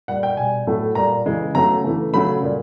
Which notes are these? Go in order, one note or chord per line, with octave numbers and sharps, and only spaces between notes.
A#2 G3 F#5
G5
B2 G3 G#5
A2 F#3 A3
A#2 G3 A#5
C#3 E3 G#3
C#3 F#3 A3 A#5
C#3 E3 A3
C#3 F#3 A3 B5
A#2 G3